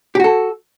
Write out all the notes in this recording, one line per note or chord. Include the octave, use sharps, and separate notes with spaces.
F#4 G4 A4